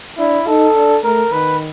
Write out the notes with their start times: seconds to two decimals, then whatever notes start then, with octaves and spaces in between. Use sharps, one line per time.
0.18 D4 E4
0.47 D#4 A4
0.75 D4
1.04 A3 A#4
1.32 D#3 B4